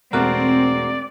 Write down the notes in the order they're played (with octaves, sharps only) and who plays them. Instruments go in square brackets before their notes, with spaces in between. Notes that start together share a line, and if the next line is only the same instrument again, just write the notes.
[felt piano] E1 A4 F#6 [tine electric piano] A3 F#4 A#4 [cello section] C4 [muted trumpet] D5